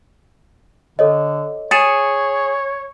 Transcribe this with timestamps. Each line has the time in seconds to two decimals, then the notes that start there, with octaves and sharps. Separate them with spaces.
0.99 D3 A4 C#5 D#5
1.71 G#4 C#5 A6 C#7 E7